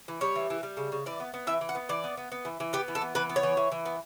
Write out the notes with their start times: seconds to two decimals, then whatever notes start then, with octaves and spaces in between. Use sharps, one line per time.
0.08 E3
0.21 G3 C#5
0.36 E3
0.50 E3
0.63 G3
0.77 C#3
0.92 C#3
1.06 E3 D5
1.20 B3
1.34 B3
1.47 E3 E5
1.61 E3
1.69 F#5
1.75 B3
1.89 E3 D5
2.04 B3
2.17 B3
2.32 B3
2.45 E3
2.60 E3
2.73 B3 G4
2.88 E3
2.95 A4
3.01 B3
3.15 E3 B4
3.30 B3
3.36 C#5
3.43 E3
3.57 E3
3.72 E3
3.86 B3